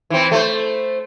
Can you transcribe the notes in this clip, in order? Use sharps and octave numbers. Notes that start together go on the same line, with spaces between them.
E3 C4
A3 C5